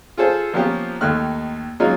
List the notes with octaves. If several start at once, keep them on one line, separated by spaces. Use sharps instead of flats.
F4 G#4 A4 C5
F3 A#3 B3 C#4 F4 G4
D#2 D#3 A3 D#4 F6 F#6
F#3 G#3 A#3 C#4 D#4 F4